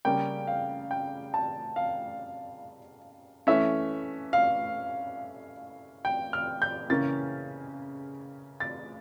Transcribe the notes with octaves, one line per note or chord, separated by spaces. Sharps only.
C#3 G3 A#3 C#4 G5
F5
G5
A5
F5
E3 A3 C#4 E5
F5
G5
F6
G6
C#3 E3 A#3 C#4 A6
A6